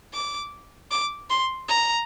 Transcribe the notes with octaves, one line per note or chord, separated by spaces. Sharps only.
D6
D6
C6
A#5